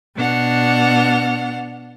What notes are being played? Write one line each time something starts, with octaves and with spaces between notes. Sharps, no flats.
B2 D4 F#5 F6